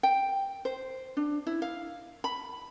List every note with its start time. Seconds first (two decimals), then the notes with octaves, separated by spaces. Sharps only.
0.03 G5
0.65 C5
1.17 D4
1.47 E4
1.62 F5
2.24 B5